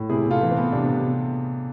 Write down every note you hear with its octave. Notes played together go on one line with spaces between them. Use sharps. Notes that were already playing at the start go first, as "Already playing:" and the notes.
Already playing: A2
C3 E4 G#4
C3
F4 A4
E3
C4
B3
C3 D4
C3